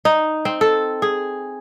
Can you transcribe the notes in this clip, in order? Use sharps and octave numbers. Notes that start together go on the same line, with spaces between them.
D#4
C4
A4
G#4